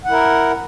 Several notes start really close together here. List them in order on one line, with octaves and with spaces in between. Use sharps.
F#5 E4 A#4